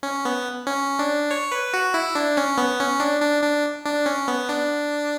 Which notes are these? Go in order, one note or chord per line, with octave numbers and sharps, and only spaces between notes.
C#4
B3
C#4
D4
C#5
B4
F#4
E4
D4
C#4
B3
C#4
D4
D4
D4
D4
C#4
B3
D4